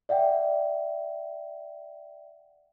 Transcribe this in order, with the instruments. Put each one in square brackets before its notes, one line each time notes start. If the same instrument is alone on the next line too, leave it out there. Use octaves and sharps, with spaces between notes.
[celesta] D5 E5 F#5 G5